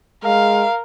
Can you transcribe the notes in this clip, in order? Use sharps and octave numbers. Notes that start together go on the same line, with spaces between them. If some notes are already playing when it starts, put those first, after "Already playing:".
G#3 A#4 F5